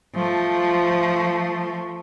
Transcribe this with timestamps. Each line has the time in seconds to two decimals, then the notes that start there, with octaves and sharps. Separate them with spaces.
0.14 F3 A3